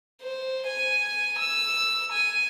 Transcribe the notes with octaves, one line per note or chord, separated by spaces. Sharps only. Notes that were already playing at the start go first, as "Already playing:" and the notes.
C5
G#5
E6
G#5